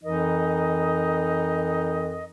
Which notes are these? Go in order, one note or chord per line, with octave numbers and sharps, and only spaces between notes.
F2 E3 D#4 A#4 D#5